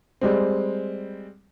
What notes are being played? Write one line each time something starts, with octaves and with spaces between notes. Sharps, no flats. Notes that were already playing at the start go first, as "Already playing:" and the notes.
G3 G#3 C4